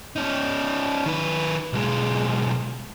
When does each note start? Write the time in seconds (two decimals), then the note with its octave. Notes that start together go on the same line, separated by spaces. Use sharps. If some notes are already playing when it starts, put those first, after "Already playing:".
0.16 C#4 D#4
1.06 D#3 B4
1.73 B1 G#3